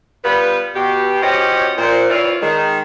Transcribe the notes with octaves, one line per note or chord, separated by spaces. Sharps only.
G3 B3 F4 B4
B2 G4
F3 C#4 F#4 G4 C#5 D#5
A#2 C5
E3 C4 E4 F4 C#5 D5
D#3 G#3